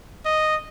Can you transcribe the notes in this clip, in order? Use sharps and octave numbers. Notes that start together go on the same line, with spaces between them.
D#5